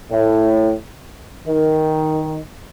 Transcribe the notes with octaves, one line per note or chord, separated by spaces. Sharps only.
A2
D#3